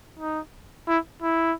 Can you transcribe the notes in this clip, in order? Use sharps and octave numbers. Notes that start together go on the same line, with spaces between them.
D#4
E4
E4